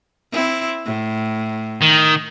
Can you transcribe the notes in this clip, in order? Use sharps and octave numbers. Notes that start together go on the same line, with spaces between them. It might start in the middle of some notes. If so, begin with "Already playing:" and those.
C4 E4
A2
D#3